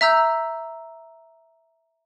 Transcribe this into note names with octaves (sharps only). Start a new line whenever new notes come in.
E5 A#5 E6 G6